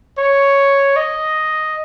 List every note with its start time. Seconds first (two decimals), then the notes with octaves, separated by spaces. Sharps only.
0.18 C#5
0.96 D#5